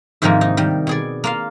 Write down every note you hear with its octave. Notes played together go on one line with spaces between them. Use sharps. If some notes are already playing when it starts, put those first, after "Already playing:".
G#2 C3 D#3 F3 G#3 A#3
D#4
D#3 G3
B2 G#4 D5
A#3 F4 F5